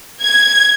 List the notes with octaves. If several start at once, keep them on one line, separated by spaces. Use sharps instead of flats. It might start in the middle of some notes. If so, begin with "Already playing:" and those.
G#6